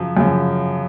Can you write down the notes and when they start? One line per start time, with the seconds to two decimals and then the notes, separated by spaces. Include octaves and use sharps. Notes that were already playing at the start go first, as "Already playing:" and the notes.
Already playing: F#2 C#3 F3
0.17 F#2 C#3 F3